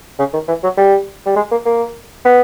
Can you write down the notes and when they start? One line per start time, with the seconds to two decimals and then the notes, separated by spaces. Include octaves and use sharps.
0.19 C#3
0.33 D#3
0.48 E3
0.63 F#3
0.77 G3
1.26 G3
1.36 G#3
1.51 A#3
1.66 A#3
2.25 B3